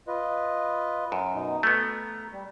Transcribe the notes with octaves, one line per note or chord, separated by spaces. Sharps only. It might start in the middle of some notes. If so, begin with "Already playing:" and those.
F4 B4 D#5
F#2
B2 D#4
A3 B3 A#5
G3